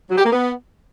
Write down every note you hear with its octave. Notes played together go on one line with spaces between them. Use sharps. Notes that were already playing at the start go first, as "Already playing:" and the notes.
F#3
G4
A#3
B3